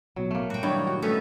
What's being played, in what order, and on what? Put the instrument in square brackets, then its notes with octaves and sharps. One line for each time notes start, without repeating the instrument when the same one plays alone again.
[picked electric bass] A1 B2 B3 [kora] F#3
[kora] A3 A#3
[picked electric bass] A#2 F#3 G3 [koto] F#4 G5
[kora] G2 E4 D5 [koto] D#3 [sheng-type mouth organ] C#5
[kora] F#4
[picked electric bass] G3 [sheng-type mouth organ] A3 [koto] B3 C#4 D#4 [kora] E5